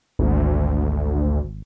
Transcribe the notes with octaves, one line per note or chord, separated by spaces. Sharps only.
G#1 D2